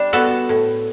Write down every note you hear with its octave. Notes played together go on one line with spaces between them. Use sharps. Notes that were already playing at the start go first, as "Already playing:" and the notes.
Already playing: G3 D4
B3 F#4 A4
A2